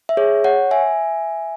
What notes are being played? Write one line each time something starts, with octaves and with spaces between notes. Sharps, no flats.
E5
G#4 C#5
C#5 F#5
E5 G#5